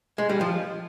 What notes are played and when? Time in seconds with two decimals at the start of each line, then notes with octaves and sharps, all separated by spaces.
0.18 G#3
0.29 G3
0.41 F3